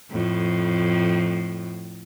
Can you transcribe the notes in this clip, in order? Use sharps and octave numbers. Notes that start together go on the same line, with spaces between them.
F2 A2